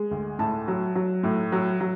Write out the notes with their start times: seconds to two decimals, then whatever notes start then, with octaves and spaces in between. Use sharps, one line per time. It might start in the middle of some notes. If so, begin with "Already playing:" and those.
Already playing: G#3
0.11 D2
0.39 A2 A5
0.68 F#3
0.95 F#3
1.23 A2
1.52 F#3
1.80 F#3